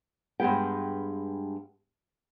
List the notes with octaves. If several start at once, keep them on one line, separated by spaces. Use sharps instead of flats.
G2 G#3 B3 G5